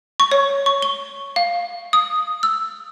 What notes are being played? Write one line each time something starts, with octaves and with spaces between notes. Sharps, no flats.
C#6
C#5
C#6
G7
F5
D#6
E6